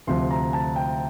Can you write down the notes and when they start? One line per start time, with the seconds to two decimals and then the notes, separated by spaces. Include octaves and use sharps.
0.07 D2 C3 F3 C6
0.31 A#5
0.53 A5
0.76 G5